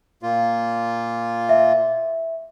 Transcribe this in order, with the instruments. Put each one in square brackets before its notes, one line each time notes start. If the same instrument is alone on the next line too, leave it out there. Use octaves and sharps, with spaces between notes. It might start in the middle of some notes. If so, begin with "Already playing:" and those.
[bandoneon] A#2 A#3 F4
[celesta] E5